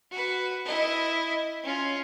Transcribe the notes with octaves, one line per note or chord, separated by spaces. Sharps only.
F#4 B4
E4 D#5
C#4 F4